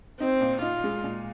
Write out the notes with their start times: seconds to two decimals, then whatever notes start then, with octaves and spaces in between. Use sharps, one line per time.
0.20 C4 D#4
0.41 A#2
0.62 D#4 F4
0.84 G#3
1.04 A#2